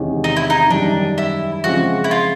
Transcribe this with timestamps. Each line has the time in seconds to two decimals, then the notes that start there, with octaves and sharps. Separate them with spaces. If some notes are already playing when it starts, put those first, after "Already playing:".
Already playing: E2 C3 D#3 G#3 C#4
0.24 D#4
0.36 E4
0.50 D#4
0.70 F#2 D#3 G3 D4
1.18 E4
1.64 C#3 F3 G#3 C4 F4 F#4
2.04 E4
2.11 F4